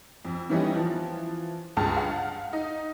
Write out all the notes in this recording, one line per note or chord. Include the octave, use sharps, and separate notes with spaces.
F2
D#3 E3 G3 B3 C#4 D#4
E3 F3
C#2 G2 G#4 A5 F6
F5 F#5
D#4